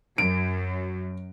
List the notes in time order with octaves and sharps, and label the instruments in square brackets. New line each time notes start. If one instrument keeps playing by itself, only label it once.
[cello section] F#2 [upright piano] D7